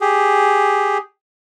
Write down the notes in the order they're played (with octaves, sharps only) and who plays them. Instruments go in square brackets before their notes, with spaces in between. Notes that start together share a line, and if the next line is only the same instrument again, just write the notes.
[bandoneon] G4 G#4